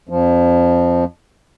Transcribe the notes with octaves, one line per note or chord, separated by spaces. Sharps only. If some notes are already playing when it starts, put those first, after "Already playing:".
F2 F3